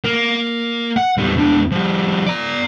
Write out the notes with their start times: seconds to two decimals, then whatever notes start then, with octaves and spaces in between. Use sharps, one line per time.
0.04 A#3
0.97 F#5
1.18 E2 G3
1.37 E2 D4
1.71 F3 G3
2.26 D5 A#5